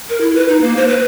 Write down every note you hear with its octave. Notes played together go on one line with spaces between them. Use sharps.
A#4
E4
B4
D#4
A#3
C5
B4